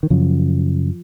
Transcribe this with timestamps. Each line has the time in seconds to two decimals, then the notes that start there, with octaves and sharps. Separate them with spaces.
0.03 D#3
0.10 F#2 C#3 F3